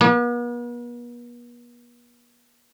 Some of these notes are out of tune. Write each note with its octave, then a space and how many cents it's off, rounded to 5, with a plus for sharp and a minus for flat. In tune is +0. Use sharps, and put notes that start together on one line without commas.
B3 -45